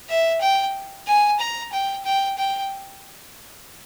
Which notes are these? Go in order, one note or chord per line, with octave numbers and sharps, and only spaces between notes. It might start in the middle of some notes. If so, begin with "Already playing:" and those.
E5
G5
G#5
A#5
G5
G5
G5